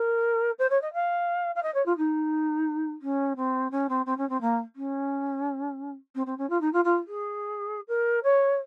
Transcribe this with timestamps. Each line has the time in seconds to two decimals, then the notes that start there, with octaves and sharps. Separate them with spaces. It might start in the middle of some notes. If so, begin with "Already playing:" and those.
Already playing: A#4
0.58 C5
0.70 C#5
0.81 D#5
0.93 F5
1.55 F5
1.62 D#5
1.74 C#5
1.85 F4
1.97 D#4
3.02 C#4
3.36 C4
3.71 C#4
3.89 C4
4.06 C4
4.17 C#4
4.29 C4
4.41 A#3
4.76 C#4
6.15 C4
6.26 C4
6.38 C#4
6.49 F4
6.61 D#4
6.73 F4
6.84 F4
7.07 G#4
7.88 A#4
8.23 C#5